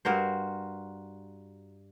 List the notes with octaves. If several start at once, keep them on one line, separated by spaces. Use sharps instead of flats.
G2 F#4 A#4 C5